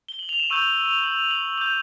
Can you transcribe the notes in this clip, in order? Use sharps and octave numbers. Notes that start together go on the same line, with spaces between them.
G7
F#7
F7
E7
C#6 E6 G6 D#7
F7
F#7
F#7
D6 G6 F#7